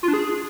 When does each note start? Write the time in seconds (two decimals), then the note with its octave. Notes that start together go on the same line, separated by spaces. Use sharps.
0.03 F4
0.08 D4
0.14 G#4